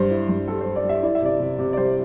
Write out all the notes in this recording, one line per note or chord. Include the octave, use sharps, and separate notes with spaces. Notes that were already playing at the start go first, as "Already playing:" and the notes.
Already playing: G2 C5
E4
G2
G3 A4
C5
G3
D5
G3 E5
E4 D5
E5
C3 D5
C3
C3
D5
G3 C5